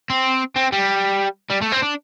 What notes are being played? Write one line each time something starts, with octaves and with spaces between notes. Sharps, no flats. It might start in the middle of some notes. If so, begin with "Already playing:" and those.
C4
C4
G3
G3
A3
C4
D4